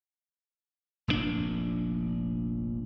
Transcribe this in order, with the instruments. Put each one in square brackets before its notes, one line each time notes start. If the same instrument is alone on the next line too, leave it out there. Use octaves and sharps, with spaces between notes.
[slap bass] F1 A#1 A#2 D4